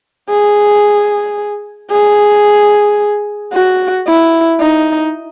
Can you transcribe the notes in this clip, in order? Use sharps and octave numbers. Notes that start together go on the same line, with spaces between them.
G#4
G#4
F#4
E4
D#4